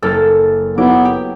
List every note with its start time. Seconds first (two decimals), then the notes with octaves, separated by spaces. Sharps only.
0.03 F#1 A#3 A4 E6 F6 A6
0.78 F#3 B3 E4 D6
1.05 G4